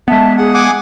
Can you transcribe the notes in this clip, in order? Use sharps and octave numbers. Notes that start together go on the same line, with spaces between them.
G#3 B3 E5 A5
G#4 F#5
F#5 G#5 D6